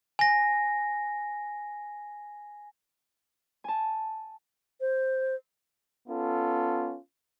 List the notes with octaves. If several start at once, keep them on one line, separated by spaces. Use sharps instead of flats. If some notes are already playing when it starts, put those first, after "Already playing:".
G#5 A#6
G#5 A5
C5
B3 C#4 F4 A4